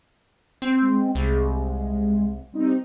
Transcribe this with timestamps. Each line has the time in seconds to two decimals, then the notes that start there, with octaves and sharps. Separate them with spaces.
0.62 C4
0.81 G#3
1.15 C2
2.52 G3 C4 D#4